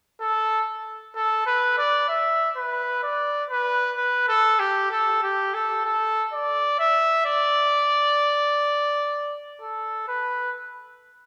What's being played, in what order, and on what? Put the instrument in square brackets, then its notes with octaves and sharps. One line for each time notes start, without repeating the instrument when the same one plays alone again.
[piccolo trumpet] A4
A4
B4
D5
E5
B4
D5
B4
B4
A4
G4
A4
G4
A4
A4
D5
E5
D5
A4
B4